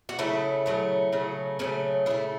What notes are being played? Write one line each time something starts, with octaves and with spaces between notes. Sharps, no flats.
F#4
C#3 F#3 A3 E4
C#3 F#3 A3
C#3 F#3 A3
C#3 F#3 A3 C#4
C#3 A3 E4